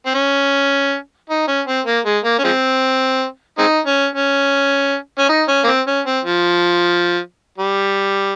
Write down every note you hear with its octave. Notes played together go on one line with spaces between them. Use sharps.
C4
C#4
D#4
C#4
C4
A#3
G#3
A#3
C#4
F3 G#3 C4
G#3 C4 D#4
C#4
C#4
C#4
D#4
C#4
A#3
C4
C#4
C4
F3
G3